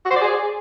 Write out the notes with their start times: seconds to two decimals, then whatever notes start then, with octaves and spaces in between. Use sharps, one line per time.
0.05 F#4
0.10 C5
0.16 D5
0.21 G#4